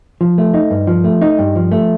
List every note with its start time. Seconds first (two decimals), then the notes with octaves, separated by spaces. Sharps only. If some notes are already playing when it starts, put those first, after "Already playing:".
0.21 F3
0.38 A3
0.54 D#4
0.71 G2
0.87 F3
1.04 A3
1.22 D#4
1.39 G2
1.56 F3
1.72 A3